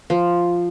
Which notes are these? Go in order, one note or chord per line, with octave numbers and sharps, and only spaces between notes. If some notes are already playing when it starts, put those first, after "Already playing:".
F3